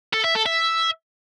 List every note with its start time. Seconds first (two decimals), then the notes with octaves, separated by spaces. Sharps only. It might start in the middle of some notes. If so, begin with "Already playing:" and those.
0.13 A4
0.24 E5
0.35 A4
0.46 E5